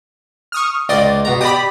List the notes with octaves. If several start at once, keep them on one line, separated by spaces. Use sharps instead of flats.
C#6 D#6 F6
C#2 D5 D#5 C6
B2 A#5
G4 D5 B5 D#6